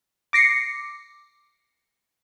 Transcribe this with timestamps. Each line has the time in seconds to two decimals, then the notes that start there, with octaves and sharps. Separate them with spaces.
0.33 D6 A#6 C7 C#7